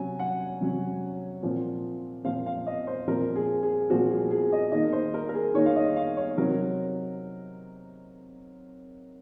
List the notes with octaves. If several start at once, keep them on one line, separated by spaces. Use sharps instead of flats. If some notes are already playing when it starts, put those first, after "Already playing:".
Already playing: C3 F#3 C#4 G#5
F#5
C3 F#3 C#4
A#2 F3 C4
A#2 F3 C4 F5
F5
D#5
C5
A#2 F3 C4 A#4
G#4
G#4
A#2 F3 C4 F#4
G#4
G#4
D#5
D#3 A#3 D#4 D#5
C5
A#4
A#4
G#4
D#3 A#3 D#4 C#5
F5
D#5
F5
C#5
C3 F#3 C4 D#4 A#4